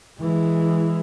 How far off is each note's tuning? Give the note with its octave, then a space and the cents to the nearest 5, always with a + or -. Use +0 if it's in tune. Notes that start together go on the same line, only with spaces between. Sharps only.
E3 +0 G#3 +0